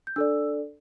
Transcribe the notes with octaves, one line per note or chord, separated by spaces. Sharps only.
G6
D4 A4 D5 E6